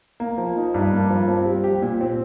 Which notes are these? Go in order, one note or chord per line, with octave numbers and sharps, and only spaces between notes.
A#3
F3
D#4
G2
A#3
F3
C4
G3
G4
A#2
C4